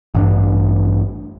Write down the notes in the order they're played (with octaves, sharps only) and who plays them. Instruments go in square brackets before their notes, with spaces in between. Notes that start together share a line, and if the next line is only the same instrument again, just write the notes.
[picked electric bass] A1 G2 D4